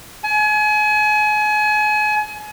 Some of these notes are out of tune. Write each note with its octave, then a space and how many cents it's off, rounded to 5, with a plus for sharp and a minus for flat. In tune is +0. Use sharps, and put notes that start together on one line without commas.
G#5 +35